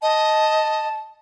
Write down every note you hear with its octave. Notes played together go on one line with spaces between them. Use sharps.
D#5 A5